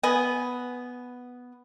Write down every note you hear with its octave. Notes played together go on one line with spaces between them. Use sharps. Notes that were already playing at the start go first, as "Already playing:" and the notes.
B3 D#5 G#5